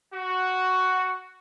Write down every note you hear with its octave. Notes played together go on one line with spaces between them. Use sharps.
F#4